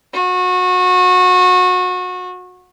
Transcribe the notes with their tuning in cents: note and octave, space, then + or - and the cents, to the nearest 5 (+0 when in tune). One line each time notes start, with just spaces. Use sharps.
F#4 -25